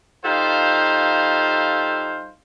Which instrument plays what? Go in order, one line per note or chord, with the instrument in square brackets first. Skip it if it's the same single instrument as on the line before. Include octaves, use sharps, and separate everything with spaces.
[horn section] G3 D#4 F4 A4 C5 F5